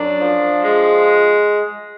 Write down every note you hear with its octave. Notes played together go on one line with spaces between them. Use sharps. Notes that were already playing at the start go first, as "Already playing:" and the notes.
Already playing: F#2 D4
F3
G#3